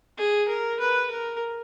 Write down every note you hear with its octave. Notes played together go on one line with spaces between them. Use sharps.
G#4
A#4
B4
A#4